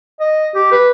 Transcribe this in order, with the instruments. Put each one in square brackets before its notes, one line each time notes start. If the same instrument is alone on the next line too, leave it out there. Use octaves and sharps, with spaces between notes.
[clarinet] D#5
G4
B4